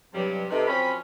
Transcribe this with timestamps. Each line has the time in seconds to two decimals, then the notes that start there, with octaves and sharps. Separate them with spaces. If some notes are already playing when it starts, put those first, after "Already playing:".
0.13 G2 C3 F#3 G3
0.50 C3 D#4 A4 B4
0.68 F#2 F3 C4 C#4 B5